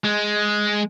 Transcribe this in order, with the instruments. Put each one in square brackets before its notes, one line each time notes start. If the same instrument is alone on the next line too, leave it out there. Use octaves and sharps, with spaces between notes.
[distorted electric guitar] G#3